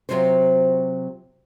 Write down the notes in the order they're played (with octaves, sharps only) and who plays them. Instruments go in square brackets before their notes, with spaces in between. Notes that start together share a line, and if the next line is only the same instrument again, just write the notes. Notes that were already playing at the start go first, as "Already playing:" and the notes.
[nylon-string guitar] C3 D#3 F#3 F4 F#4 C5